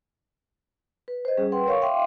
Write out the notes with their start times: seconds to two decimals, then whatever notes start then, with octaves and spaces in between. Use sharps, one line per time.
1.08 B4
1.25 C5 D#5
1.38 G3 C#4 G#4
1.52 B4 F#5 G5 C6
1.66 A#4 C#5 F5 C#6
1.82 E5 F5 G5 C6 D6